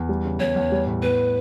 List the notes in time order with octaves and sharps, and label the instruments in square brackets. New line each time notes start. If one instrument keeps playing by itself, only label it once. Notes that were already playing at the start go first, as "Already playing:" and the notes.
Already playing: [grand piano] E2
G3
C#3
[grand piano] E2 [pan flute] C#5
[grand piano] E2
G3
A2
[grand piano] B3 [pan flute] B4